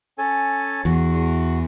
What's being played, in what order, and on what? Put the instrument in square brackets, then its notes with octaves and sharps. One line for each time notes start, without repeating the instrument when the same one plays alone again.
[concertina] C#4 A4 G#5
[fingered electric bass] E2 [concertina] F#4